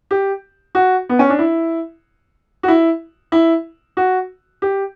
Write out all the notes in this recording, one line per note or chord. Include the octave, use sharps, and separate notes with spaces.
G4
F#4
B3
C#4
D4
E4
F#4
E4
E4
F#4
G4